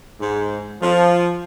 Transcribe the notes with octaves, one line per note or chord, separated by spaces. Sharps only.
G#2
F3